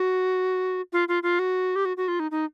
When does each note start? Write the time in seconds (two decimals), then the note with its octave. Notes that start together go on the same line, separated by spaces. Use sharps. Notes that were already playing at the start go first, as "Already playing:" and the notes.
Already playing: F#4
0.93 F4
1.08 F4
1.23 F4
1.39 F#4
1.76 G4
1.85 F#4
1.97 F#4
2.08 F4
2.20 D#4
2.31 D#4